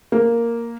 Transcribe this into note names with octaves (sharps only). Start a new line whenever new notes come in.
A#3